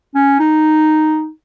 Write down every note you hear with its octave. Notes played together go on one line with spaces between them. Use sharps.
C#4
D#4